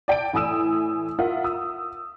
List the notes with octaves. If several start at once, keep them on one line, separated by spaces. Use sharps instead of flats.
D5 G5 A5 D7
A2 E3 G#5 D#6 E6 E7
F4 A#4 E5 F#5
D#6 E6